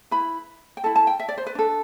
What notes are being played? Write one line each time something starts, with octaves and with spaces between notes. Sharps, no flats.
E4 B4 B5
G5
E4 A4 A5
A5
G5
E5
D5
C5
B4
D4 A4